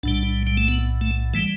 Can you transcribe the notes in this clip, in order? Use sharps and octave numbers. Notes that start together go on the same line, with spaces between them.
B1 A2 G3 D4
G3
A3
B3
A3
E3 G3 A3